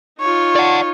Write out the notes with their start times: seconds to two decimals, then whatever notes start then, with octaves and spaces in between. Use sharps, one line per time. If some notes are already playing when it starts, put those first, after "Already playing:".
0.20 D#4 F4 C#5
0.56 D5 F#5